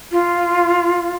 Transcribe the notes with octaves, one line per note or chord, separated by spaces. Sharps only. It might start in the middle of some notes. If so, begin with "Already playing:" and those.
F4